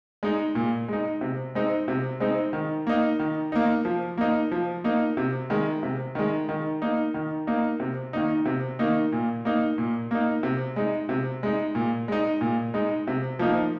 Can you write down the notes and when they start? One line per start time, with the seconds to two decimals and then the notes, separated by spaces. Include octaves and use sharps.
0.23 G#3 D#4
0.55 A#2
0.88 G#3 D#4
1.21 C3
1.55 G#3 C4 D#4
1.88 C3
2.20 G#3 C4 D#4
2.53 D#3
2.87 A#3 D#4
3.19 D#3
3.52 A#3 D#4
3.85 F3
4.17 A#3 D#4
4.52 F3
4.84 A#3 D#4
5.17 C3
5.50 D#3 G#3
5.83 C3
6.15 D#3 G#3
6.49 D#3
6.82 A#3 D#4
7.14 D#3
7.47 A#3 D#4
7.80 C3
8.13 D#3 A#3 D#4
8.45 C3
8.79 D#3 A#3 D#4
9.12 A#2
9.45 A#3 D#4
9.78 A#2
10.11 A#3 D#4
10.43 C3
10.76 G#3 D#4
11.09 C3
11.43 G#3 D#4
11.75 A#2
12.08 G#3 D#4
12.41 A#2
12.74 G#3 D#4
13.07 C3
13.39 F3 A#3 D#4